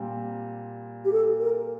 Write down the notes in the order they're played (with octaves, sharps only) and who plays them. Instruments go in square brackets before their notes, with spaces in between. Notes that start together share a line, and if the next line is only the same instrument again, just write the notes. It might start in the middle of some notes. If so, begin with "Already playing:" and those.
Already playing: [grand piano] A#2 G3 C4
[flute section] G4
A4
A#4